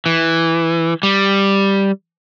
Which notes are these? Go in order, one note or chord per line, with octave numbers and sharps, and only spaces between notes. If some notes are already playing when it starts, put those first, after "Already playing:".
E3
G3